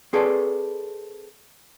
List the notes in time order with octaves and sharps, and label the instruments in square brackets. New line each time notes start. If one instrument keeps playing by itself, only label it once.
[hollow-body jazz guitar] C4 G#4 A4 B4 D5